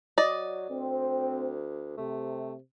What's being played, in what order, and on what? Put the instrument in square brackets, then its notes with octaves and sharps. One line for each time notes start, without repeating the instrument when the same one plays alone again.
[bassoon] F#3 [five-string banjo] D5 D#5
[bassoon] D2 [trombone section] C4
[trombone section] C3 [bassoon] A3